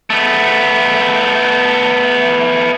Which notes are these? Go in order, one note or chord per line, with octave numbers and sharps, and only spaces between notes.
A3 B3